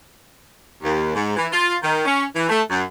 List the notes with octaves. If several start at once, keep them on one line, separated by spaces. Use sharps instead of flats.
D#2
G#2
E3
F4
D#3
C#4
E3
A3
F#2